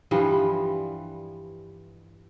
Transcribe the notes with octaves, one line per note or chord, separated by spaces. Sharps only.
G2 E3 F3 G3